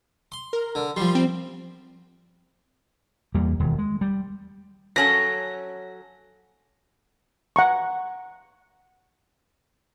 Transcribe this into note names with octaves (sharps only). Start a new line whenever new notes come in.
C6
A#4
D3
F3 G3 C6
C4
E2 G3 A#3
E1 D#2
G#3
G3
F#3 C#4 A4 A#6
F#5 A#5 C#6